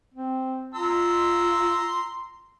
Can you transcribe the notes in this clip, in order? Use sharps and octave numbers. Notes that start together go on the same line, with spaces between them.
C4
F4 A#5 C6 E6